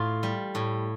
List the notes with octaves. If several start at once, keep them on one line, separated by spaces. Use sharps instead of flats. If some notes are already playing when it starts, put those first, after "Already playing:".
Already playing: A2 F4
G3
A2